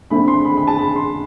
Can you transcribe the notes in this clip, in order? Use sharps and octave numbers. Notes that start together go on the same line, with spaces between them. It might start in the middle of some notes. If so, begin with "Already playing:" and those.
D3 A3 C4 B5
C6
B5
B5
A5
B5
C6